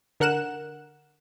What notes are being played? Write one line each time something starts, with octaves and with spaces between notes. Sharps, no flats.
D3 A#4 F#5 F#6 E7